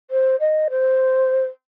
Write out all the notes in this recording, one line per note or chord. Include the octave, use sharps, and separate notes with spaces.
C5
D#5
C5